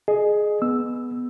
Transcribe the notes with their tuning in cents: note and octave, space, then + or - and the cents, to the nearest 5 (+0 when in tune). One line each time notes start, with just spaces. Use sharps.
G#4 +15 D#5 -25
B3 +0 E6 +0